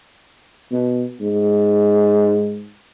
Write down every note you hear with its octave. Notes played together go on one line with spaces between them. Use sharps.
B2
G#2